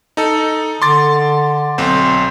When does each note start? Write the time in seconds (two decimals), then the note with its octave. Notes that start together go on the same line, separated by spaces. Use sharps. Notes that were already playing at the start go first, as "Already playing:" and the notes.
0.17 D#4 A4
0.82 D3 C6 D6 A6
1.78 B1 C4 C5